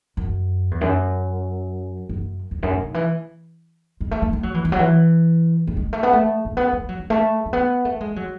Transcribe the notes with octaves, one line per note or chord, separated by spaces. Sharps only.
F#2
E2
F#2
F#2
E2
F#2
A2
D#3
E3
G#3
A3
A3
A3
F#3
E3
E3
F#3
E3
A3
G#3
A3
B3
A3
A3
B3
G#3
F#3
F#3
A3
A3
B3
A3
G#3
F#3